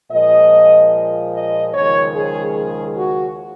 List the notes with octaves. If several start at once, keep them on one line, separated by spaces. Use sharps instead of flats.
A#2 F3 G#3 D#5
D#5
D#2 C#3 F3 G#3 C#5
G#4
G#4
F#4